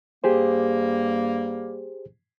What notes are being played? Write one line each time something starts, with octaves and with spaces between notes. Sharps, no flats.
G2 G3 A#3 G4 G#4 C5